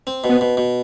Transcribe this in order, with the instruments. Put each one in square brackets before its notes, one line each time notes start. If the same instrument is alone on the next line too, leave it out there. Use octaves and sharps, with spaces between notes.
[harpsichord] C4
B2
[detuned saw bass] B3
[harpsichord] B2
B2